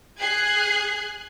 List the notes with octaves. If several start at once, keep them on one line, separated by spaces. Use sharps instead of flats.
G#4 F#6 G#6 C7